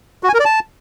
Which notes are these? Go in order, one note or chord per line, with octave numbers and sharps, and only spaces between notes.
F#4
G#5
A#4
D5
A5